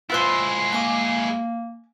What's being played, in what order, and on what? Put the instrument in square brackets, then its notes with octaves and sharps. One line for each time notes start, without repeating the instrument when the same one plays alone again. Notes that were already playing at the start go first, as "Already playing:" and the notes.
[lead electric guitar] G#3 E4 [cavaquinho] F4 B4 C5 [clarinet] E6
[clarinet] A#3 [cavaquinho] G#5 D6